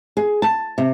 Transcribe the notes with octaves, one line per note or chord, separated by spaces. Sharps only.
G#4
A5
C3